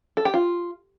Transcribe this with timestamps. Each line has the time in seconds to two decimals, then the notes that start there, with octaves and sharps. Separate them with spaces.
0.17 A4
0.25 G4
0.34 F4